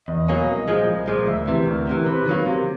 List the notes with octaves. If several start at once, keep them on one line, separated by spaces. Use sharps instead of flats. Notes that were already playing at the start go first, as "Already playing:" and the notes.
E2 D#5
B2 F#3 A#3 C#4
C2
A#2 F3 G#3
C2
A#2 F3 G#3
D2 E5
C3 E3
D2 A#4
C3 E3
C3 B4
D#3 F#3 A#3
C3